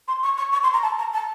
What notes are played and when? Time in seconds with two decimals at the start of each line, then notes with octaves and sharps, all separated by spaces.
0.08 C6
0.23 C#6
0.38 C#6
0.53 C#6
0.63 C6
0.73 A#5
0.83 A5
0.98 A#5
1.13 A5